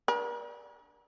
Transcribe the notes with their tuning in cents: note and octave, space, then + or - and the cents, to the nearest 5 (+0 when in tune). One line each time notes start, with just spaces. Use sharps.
D4 +0 A#4 +45